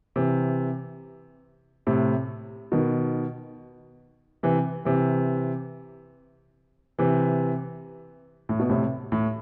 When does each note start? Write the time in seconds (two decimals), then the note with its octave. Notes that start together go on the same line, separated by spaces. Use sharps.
0.16 C3 E3
1.87 A2 C3
2.72 B2 D#3
4.43 C3 E3
4.85 C3 E3
6.99 C3 E3
8.49 A2
8.59 B2
8.70 A2 C3
9.12 A2